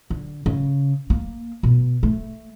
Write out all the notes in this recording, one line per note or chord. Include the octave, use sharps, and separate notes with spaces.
D3
C#3
A#3
B2
A3